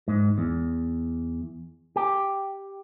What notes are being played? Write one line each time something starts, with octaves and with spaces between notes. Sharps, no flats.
G#2
E2
G4